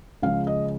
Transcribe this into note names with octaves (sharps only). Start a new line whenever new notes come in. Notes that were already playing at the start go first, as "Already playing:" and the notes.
C#2 C#3 F3 G#3 F5
D#5